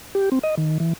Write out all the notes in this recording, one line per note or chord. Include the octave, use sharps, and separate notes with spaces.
G4
C4
D#5
D#3
E3